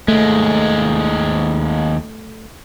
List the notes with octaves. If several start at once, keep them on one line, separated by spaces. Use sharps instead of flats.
D#2 G#3 A3